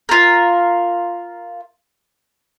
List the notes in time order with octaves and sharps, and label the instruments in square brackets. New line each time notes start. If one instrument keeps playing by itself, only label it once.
[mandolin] F4 A#4